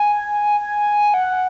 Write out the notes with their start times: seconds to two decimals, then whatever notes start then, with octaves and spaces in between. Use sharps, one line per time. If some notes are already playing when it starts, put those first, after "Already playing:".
Already playing: G#5
0.60 G#5
1.14 F#5